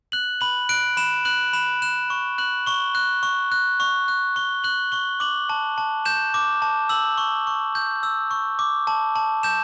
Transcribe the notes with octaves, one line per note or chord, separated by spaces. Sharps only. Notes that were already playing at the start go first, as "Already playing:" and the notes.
F#6 F#7
B5 F#7
F#6 D7
B5 E7
F#6 F#7
B5 E7
F#6 E7
C#6
F#6 F#7
C#6 G7
F#6
C#6
F#6
C#6
F#6
C#6 G7
F#6 F#7
C#6 G7
D6 F#7
A5
A5
G6 E7
D6
A5
E6 F#7
C#6
C#6
G6
E6
C#6
D6
A5
A5
G6 E7